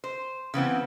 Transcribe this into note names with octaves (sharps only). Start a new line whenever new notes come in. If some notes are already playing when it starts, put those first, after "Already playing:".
C5
C#3 E3 B3 C4